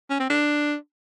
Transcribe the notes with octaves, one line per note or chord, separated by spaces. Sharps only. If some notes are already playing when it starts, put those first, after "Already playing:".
C#4
C4
D4